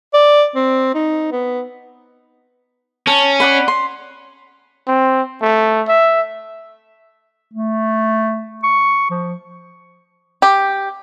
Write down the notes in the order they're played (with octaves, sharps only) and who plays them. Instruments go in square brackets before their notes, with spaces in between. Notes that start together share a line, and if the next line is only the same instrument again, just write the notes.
[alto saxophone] D5
C4
D#4
B3
[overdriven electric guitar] C#4 [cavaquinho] A5
[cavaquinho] D5 F#5 B5
C6
[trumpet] C4
A3
E5
[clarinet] A3
C#6
F3
[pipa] G4